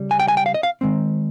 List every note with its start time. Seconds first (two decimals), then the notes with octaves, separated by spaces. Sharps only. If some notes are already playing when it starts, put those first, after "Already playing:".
Already playing: C#3 G3
0.11 G#5
0.20 G5
0.28 G#5
0.37 G5
0.46 F5
0.54 D#5
0.63 F5
0.81 D#3 G#3 C4